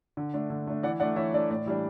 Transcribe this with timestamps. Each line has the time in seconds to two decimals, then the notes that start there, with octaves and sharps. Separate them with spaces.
0.17 D3
0.34 A3 D4
0.50 D3
0.67 A3 D4
0.83 E3 D5 F#5
1.00 D4 D5 F#5
1.03 A3
1.16 E3 C#5 E5
1.34 A3 D4 D5
1.50 A2 D5
1.66 E3 G3 D4